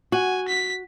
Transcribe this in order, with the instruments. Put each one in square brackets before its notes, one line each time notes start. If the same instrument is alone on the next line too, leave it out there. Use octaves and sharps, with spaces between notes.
[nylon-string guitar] F#4 [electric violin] G#5
[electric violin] B6